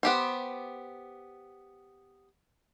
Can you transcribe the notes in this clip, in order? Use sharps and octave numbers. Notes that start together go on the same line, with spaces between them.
B3 G4 C5